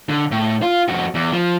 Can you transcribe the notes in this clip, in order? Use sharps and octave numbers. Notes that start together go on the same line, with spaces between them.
D3
A2
F4
F2 F#4
E2
F3